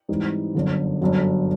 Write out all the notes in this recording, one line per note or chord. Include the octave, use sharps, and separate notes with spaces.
G#2 E3 G3 C4 D#4
G1 F#2 D3
G1 F#2 D3 F#3